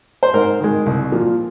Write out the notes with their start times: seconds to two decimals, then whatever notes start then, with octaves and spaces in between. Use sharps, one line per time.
0.23 C5
0.34 G#2 A#4
0.60 D#3 G#3
0.86 C2
1.12 A#2 F3